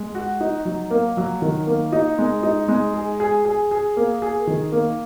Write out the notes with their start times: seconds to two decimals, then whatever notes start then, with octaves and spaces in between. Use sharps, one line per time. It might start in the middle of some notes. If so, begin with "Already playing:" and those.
Already playing: G#3
0.15 F#4
0.41 D#4
0.65 F#3
0.90 A#3
1.17 F#3
1.42 D#3
1.67 A#3
1.92 D#4
2.19 G#3
2.43 D#4
2.68 G#3
2.94 G#4
3.20 G#4
3.45 G#4
3.71 G#4
3.96 A#3
4.22 G#4
4.47 D#3
4.72 A#3